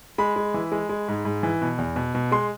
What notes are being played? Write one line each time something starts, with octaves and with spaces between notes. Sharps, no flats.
G#3 B5
G#3
E3
G#3
G#3
G#2
G#2
E3
B2
E2
B2
B2
G#3 C6